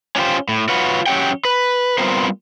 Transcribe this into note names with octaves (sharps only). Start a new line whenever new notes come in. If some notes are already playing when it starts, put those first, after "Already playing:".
C#4 D4 F4 G4 C5
A2
F4 F#4 B4 C#5
F#3 C#4 G4 F#5 G5
B4
G3 B3 C4 F4 A#4 C5